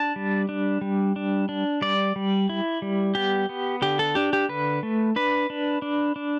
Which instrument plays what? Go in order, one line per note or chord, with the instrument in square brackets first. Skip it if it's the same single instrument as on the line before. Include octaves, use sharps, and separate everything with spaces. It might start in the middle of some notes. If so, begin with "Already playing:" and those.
Already playing: [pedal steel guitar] D4 A5
G3
D4
G3
D4
D4
G3 D5
G3
E4
G3
B3 G4
B3
D3 G4
A4
D4 G4
G4
D3 B4
A3
D4 B4
D4
D4
D4